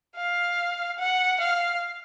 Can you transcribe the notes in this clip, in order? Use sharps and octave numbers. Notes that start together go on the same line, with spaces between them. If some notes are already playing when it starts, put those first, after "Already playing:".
F5
F#5
F5